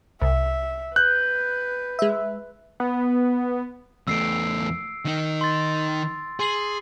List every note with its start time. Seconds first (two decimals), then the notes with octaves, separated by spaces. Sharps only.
0.22 C2 E5
0.96 B4 F#6 G6
1.99 G#3 E5
2.80 B3
4.07 E2 A3 E6 C7 D7
5.05 D#3 D#4
5.41 C6 A6
6.40 G#4 C6 C7 F#7